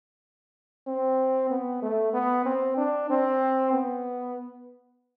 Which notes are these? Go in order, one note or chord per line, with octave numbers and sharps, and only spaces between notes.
C4
B3
A3
B3
C4
D4
C4
B3